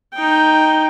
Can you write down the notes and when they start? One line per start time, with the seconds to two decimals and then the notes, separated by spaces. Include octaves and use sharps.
0.15 D#4 G5